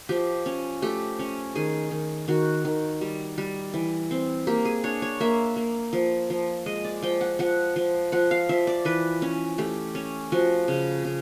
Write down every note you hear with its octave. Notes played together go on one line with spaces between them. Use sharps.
F3 G4
C#4
A3 G4
C#4
D#3 G#4
D#3
D#3 F#4
D#3
G3
G3
E3
C4
A#3 G4
G#4
D4 C#5
C#5
A#3 E5
A#3
F3
F3
G#3 D#5
D5
F3 G5
F#5
F3 F#5
F3
F3 F#5
F5
F3 E5
D5
E3 B4
C#4
A3 G4
C#4
F3 F#4
C#3
C#3